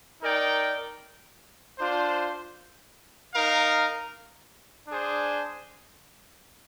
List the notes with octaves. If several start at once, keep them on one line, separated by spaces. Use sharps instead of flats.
D#4 A#4 D5 G5
D4 F4 C5
D#4 A#4 F5
D4 G#4 C5